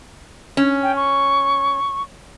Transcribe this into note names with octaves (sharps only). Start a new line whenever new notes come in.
C#4
G5
C#6